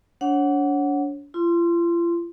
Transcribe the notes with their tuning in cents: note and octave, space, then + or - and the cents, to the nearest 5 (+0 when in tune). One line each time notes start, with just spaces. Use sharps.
D4 -40 C#5 -25 F#5 +0
F4 -40 C6 +0